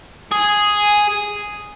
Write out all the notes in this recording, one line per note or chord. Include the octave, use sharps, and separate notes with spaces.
G#4